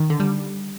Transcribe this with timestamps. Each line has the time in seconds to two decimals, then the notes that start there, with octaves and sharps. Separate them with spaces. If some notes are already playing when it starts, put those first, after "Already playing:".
Already playing: D#3
0.10 D3
0.20 G3